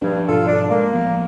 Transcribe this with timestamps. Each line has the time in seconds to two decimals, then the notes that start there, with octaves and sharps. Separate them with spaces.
0.02 G2 F3 D4
0.29 G#2 B2 F3 F4 A4
0.47 D4
0.71 G#3 A#3
0.93 A1 F3 B3